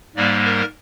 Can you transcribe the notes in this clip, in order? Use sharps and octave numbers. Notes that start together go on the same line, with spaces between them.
G#2 G3 A#3 D5
A#4